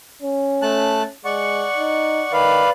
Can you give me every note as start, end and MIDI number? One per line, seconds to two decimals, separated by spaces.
0.22 1.15 61
0.62 1.02 57
0.62 1.02 81
0.62 1.02 90
1.25 1.67 56
1.25 2.32 74
1.25 2.32 78
1.25 2.32 85
1.78 2.25 63
2.33 2.63 51
2.33 2.70 71
2.33 2.70 74
2.33 2.70 77